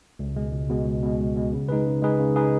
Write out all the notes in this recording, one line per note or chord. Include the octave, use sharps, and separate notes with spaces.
C#2
B2 G#3
C#2
B2 G#3
C#2
B2 G#3
C#2
B2 G#3
C#3
G#3 D#4 G#4 B4
C#3
G#3 D#4 G#4 B4
C#3
G#3 D#4 G#4 B4